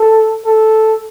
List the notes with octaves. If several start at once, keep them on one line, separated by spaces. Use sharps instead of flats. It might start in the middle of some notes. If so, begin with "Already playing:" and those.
Already playing: A4
A4